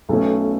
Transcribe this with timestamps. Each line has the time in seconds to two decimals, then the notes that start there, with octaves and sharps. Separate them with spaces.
0.09 B1 B2 A3 C#4 A4